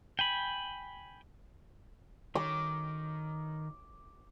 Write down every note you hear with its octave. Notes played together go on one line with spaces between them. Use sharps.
G5 G#5 B5
D#3 D6